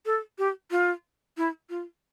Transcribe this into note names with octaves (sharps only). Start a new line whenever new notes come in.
A4
G4
F4
E4
F4